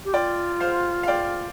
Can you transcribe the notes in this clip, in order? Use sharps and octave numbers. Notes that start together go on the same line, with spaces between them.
G4
F4 D5 G5
C5 F5
F5
D5 G5